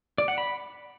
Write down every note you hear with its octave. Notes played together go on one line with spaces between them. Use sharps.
D5
F#5
B5